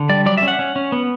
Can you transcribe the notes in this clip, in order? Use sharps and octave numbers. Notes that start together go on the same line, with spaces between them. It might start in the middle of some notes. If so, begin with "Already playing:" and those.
Already playing: D3
G3 D5
F#3 D5
E5
C#4
F#5
C#4
C#4
B3